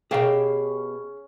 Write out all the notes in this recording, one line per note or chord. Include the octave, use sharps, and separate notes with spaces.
B2 C#4 G4 G#4 E5 F5